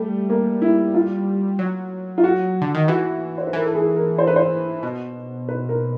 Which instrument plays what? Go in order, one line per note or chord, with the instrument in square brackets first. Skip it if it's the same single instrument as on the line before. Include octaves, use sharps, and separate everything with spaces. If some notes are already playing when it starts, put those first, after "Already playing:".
Already playing: [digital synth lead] G3 [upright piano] A3
[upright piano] A#3
E4
F4
[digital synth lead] F#3
[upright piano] F4
F#4
[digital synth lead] D3
D#3
[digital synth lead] E3 [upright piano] F#4
[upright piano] C5
B4
[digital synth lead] E3 [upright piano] A#4
[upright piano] A4
G#4
A#4
C5
B4
C5
[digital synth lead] B2
[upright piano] B4
A#4